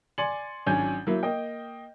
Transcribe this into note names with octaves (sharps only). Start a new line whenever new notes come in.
D5 G#5 C6 A6 C#7 F#7
G#1 F#3 C#4 D4 G#5 G6
F#3 A#3 E4
A#3 D#5 G5